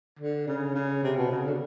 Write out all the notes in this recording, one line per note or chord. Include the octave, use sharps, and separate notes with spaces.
D3
C#3
C#3
C3
B2
C#3
D3